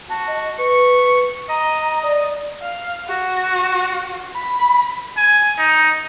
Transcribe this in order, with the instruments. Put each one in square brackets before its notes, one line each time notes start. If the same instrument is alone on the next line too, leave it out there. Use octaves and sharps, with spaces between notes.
[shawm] F#4 [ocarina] A5
[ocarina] D#5
[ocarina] B4 [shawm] C#6
[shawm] D#5 [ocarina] A#5
[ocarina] D5
[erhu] F5
F#4
B5
[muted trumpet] G#5
D#4